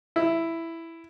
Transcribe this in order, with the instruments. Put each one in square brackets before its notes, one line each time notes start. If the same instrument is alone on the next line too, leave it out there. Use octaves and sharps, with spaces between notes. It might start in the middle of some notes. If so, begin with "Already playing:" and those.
[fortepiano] E4